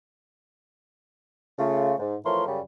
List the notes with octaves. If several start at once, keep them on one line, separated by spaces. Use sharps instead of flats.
C#3 A3 F4
G#2
E3 F3 A3 A#4 C#5 C6
F#2 C#3 F#3 G3